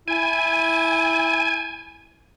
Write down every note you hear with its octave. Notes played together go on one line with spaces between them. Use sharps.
E4 G#5